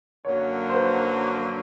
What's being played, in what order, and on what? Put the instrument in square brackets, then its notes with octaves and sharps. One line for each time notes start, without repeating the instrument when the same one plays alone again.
[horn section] F#2 D3 F#3 A#3 [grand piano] C#5
[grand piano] C5
B4